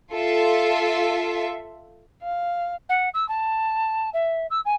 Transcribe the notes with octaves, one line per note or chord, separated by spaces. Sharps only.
F4 A4 E5
F5
F#5
E6
A5
E5
E6
G#5